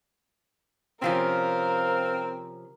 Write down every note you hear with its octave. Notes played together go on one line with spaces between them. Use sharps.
C3 F3 C4 C#4 A#4 F5